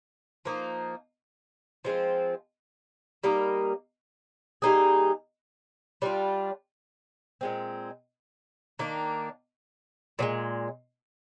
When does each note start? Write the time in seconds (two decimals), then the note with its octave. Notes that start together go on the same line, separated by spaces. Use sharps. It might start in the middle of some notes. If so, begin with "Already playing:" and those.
0.45 F3 A#3 D#4
1.85 F3 G#3 C4 F4
3.24 G3 A#3 D#4 A#4
4.62 G3 A#3 D#4 G#4
6.02 G3 D4 F4
7.41 A#2 G#3 C4
8.79 D#3 A#3 D4
10.19 A#2 F3 G#3